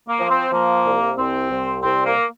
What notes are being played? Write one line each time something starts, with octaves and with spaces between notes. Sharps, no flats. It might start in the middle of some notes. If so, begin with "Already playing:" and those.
A#3
F3
C4
F3 A#3
C2
C2 C4
C2
C2 C4
A#3